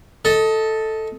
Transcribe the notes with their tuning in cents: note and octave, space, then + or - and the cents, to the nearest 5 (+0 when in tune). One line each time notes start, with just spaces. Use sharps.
A4 +0 D#5 +20